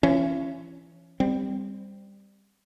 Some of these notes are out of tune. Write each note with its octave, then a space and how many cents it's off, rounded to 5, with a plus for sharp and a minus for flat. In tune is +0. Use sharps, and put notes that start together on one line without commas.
E3 +40 C#4 -15
G3 +20 C4 -5